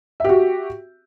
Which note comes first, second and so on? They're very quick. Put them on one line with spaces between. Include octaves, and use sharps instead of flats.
E5 G4 F#4